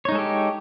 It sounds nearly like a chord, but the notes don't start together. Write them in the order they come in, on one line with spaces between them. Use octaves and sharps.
C#5 D#4 G#3 A4 G4